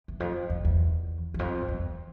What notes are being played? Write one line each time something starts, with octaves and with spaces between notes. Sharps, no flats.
E2
F2
F2
E2
E2
F2
E2